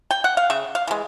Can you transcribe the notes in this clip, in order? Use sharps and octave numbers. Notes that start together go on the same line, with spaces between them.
G5
F#5
F5
C#3 E5
F5
E3 G#3